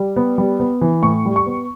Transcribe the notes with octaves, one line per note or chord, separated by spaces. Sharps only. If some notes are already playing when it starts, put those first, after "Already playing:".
Already playing: G3
B3
G3
B3
E3
A2 C#6
G3
C#6
B3